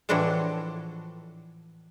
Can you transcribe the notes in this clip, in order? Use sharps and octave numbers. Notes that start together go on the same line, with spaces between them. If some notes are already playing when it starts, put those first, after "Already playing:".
A2 E3 F3 D4 F#4 A4